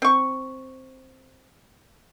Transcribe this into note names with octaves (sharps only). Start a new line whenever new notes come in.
C4 C#6